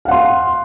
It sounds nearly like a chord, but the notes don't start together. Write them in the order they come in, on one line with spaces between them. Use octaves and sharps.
F5 F#5 C6